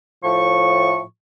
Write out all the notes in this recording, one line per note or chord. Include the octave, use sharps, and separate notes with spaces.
A2 F3 C#6